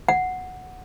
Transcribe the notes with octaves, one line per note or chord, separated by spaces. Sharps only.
F#5